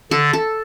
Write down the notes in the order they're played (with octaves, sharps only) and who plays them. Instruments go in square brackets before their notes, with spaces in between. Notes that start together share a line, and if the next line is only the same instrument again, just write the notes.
[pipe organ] D3 [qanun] A4
[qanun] A4